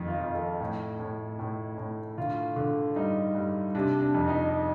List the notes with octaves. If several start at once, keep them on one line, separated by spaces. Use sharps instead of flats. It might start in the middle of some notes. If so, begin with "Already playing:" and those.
Already playing: F2 D#3
F4
F2
A4
A2
A2
A2
A2
D3 F4
D3
G2 D#4
G2
C3 D4
D4
F2
D#4